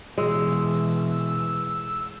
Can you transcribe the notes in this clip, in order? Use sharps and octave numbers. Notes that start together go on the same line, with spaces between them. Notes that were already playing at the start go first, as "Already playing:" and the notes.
B2 E3 G#3 E6